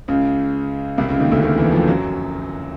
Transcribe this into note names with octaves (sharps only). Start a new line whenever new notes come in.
C#2 C#3
C2 C3
C#2 C#3
D#2 D#3
D2 D3
D#2 D#3
E2 E3
F2 F3
F#2 F#3